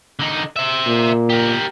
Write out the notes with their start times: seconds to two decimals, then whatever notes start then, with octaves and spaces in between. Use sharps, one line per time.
0.19 D3 D#4
0.56 C5 E5
0.87 A#2
1.30 G4 A#4